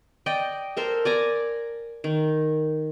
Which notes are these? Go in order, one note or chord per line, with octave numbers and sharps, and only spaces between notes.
D5 D#5 G5
A4 A#4 C5 C6
D5 G#5 A#5
D#3